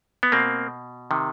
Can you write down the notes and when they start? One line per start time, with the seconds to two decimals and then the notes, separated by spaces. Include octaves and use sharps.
0.23 B3
0.32 B2 A#3 C4
1.11 C3 D#3